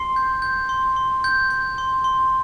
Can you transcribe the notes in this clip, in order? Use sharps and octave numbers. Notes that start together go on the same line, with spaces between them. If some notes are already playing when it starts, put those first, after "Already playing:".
Already playing: C6 C7
G6
G6
C6
C6
G6
G6
C6
C6